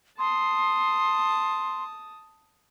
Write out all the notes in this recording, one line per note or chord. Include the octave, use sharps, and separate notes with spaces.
A5 C6 D#6